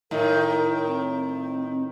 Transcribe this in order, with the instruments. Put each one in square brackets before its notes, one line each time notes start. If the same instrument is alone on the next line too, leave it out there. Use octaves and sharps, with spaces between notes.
[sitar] A2 D#3 [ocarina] A#4
[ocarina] C4